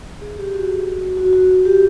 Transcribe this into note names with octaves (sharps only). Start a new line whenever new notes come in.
G#4
G4
F#4
F#4
F#4
G4